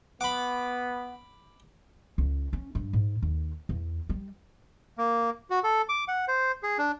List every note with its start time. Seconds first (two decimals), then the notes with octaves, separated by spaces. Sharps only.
0.21 B3 F#5 B5 D6
2.18 C#2
2.53 C#4
2.75 G2
2.93 G#2
3.22 D#2
3.69 E2
4.09 G3
4.98 A#3
5.50 F#4
5.64 A4
5.89 D6
6.08 F#5
6.28 C5
6.63 G#4
6.78 D4